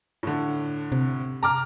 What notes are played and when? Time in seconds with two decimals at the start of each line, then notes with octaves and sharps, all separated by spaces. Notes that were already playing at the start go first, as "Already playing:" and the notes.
0.23 A2 D3
0.92 C3
1.43 A#5 D6 F6